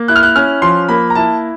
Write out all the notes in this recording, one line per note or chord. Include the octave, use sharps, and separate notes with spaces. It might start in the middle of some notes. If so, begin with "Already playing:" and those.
Already playing: A#3
E4 F#6
F6
F#6
C#4 F6
F3 C6
A#3 B5
A#5
E4 A5